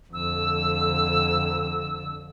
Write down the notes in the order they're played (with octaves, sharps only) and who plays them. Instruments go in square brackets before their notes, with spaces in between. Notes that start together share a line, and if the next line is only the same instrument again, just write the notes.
[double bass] F2 D3 [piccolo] E6